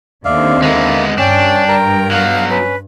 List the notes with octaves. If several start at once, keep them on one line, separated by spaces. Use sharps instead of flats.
D#2 D3 C4 D5 E5 F5
G#3 A#3 B3 E5
G2 C#4 D4 G5
A#4 A#5
F#3 B3 F5
C#4 B4